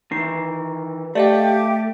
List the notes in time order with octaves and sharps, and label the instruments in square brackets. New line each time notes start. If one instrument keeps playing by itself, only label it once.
[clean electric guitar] D#3 E3 [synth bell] C7
[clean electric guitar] A3 [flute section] G4 [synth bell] D5 D#5 F5